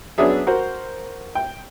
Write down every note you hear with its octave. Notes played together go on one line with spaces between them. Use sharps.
F#3 B3 C#4 D4 G#4 E5
F#4 A#4 C5
G5